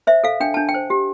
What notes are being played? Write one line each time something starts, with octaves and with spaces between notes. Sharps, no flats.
C5 E5
A4 F5
D4 G5
D4 A5
G5
C5
G4